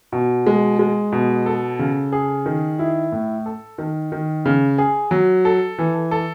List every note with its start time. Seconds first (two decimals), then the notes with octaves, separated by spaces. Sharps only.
0.12 B2
0.47 G#3
0.79 G#3
1.12 B2
1.46 A4
1.79 C#3
2.12 G#4
2.46 D#3
2.79 E4
3.12 A2
3.46 A4
3.78 D#3
4.12 D#3
4.46 C#3
4.78 G#4
5.11 F#3
5.45 A4
5.78 E3
6.11 A4